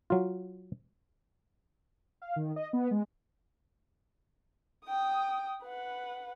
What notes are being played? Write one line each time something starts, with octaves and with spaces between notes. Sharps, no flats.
F#3 F4
F5
D#3
D#5
B3
G#3
G5 D#6
B4 F#5